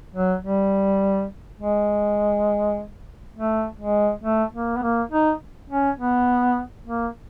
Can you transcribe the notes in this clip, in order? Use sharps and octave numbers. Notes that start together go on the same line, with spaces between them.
F#3
G3
G#3
A3
G#3
A3
A#3
B3
A#3
D#4
C#4
B3
A#3